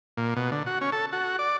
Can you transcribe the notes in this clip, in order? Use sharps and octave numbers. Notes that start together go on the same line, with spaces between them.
A#2
B2
D3
F#4
C#4
A4
F#4
D5